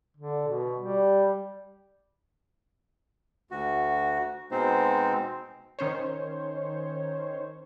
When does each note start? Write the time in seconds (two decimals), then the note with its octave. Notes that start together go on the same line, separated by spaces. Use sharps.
0.17 D3
0.48 B2
0.77 G3
3.51 D2 F#4
4.51 B2 G#3 C4 D#4 C5
5.79 D#3 C#4 C5 C#5